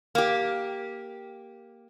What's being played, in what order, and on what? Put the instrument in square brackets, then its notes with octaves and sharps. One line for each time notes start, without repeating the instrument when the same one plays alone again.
[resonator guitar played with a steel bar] A#3 G4